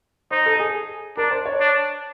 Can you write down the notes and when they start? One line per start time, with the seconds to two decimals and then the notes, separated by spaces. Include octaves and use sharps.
0.31 D#4 C5
0.46 A4
0.60 G#4
1.17 D4 A#4
1.31 C5
1.46 C#5
1.60 D4